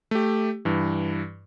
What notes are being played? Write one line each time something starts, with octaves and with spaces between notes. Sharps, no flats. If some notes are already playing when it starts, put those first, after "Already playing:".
A3 G4
G2 E3